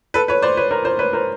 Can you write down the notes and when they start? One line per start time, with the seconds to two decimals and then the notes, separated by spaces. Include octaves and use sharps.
0.14 A4 B4
0.28 B4 C#5
0.42 C5 D5
0.57 B4 C#5
0.71 A#4 C5
0.85 A#4 C5
0.99 B4 C#5
1.13 A#4 C5